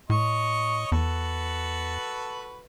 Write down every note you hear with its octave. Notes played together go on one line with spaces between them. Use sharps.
A2 C#5 D#5 C#6
E2 F#4 A4 B4